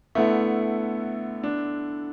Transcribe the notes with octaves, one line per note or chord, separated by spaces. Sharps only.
D3 A3 B3 E4
D4